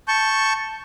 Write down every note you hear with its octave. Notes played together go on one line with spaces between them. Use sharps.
A5 C#6 G6